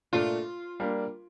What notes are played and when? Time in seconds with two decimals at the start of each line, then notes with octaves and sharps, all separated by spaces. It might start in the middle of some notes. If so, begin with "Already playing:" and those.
0.13 A#2 A3 D4 F4
0.80 G3 A#3 D4